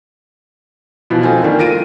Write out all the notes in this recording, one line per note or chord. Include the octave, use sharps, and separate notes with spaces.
B2 E3 F3
A3 C4 D#4 F4 G#5
D3 D#3 G3 A#3
F4 A#6 D7 D#7